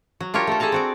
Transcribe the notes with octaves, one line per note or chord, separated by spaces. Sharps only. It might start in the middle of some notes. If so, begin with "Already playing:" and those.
F#3
D4 F4 G4 A#4 C#5
A3 A4
G#4 A4 D5 A5 A#5
C4 F#4 D5